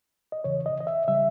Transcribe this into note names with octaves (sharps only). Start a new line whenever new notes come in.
D#5
E2 C#3 E3 C#5
D#5
D#5
E5
C#3 G3 E5